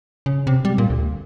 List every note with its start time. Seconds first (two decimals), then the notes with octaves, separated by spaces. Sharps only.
0.26 C#3
0.47 C3
0.65 G3
0.78 A#2
0.90 D2